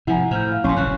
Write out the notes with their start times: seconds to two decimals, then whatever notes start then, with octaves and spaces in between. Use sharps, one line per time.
0.07 C3 F3 E4 F#5 G#5 A#5
0.31 A2 C5 F6 G6
0.52 F5
0.64 A#1 A2 C#4 A5 C6 C#6
0.77 F#1 A#2 E3 F#6